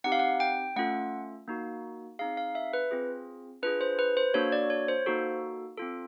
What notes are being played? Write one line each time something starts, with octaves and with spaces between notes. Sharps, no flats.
C4 D#4 G4 F#5
F5
F#5
G5
A3 C#4 F4 A4 F#5
A#3 D#4 F#4
C4 D#4 G#4 F5
F5
E5
B4
C4 F4 G#4
D4 F4 G#4 B4
C5
B4
C5
A#3 D4 F#4 A4 C#5
D5
C#5
C5
A#3 D#4 F#4 A4
C4 F4 A4